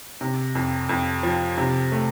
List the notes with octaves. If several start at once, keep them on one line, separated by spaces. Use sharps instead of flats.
C3
F2
F2
F3
C3
A3